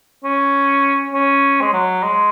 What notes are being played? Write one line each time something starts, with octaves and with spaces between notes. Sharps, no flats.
C#4
C#4
G#3
F#3
G#3